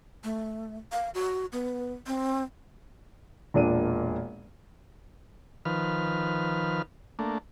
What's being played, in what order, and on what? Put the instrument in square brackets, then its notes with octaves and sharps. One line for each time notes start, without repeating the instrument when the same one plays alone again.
[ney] A3
F5
F#4
B3
C4
[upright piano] E1 A#2 D4 F4 A#4 D#7
[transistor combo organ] D#3 F3 B4 F6
A3 A#3 D4